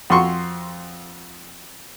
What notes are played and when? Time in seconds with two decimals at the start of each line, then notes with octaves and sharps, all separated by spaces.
0.10 F2 F#4 C6 C#6